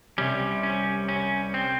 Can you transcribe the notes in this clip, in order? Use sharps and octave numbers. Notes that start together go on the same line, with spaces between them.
C2 C3 G3 C#4
C#4
C#4
C4